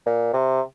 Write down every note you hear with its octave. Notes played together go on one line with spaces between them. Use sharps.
A#2
C3